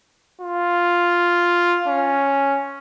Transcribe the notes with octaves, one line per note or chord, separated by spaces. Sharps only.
F4
C#4